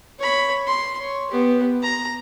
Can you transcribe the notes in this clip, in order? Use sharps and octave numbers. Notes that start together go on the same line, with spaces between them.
C#5 B5
C6
C#5
B3 G4
A#5